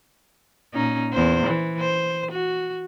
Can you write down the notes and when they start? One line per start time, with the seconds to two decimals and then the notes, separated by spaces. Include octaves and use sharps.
0.74 A#2 C#4 D#4
1.13 E2 C5
1.47 E3
1.79 C5
2.31 F#4